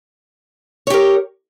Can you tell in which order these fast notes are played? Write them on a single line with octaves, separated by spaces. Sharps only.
C#5 G4 A#4